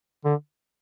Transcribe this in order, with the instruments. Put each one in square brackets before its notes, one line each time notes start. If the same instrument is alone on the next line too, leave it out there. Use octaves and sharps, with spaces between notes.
[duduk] D3